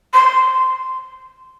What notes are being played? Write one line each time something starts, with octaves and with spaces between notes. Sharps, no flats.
C6